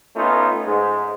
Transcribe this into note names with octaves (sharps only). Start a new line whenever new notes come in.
A3 B3 C#4 D#4 F4
G#2 G#3